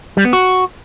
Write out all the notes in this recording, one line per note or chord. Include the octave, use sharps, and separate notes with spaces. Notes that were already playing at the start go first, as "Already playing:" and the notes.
G3
B3
F#4